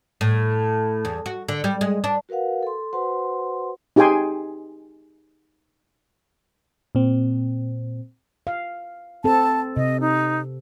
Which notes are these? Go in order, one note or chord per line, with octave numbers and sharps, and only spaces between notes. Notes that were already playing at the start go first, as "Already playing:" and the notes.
A2
E2
F#4
D3
G3
G#3
D4
F#4 A#4 B4 F5 F#5
A4 C6
F#4 B4 C5 F#5 C6
D#4 G4 G#4 G5 G#5 C6
A#2 C4
F5
C4 A4 A5
C3 D#5
D#4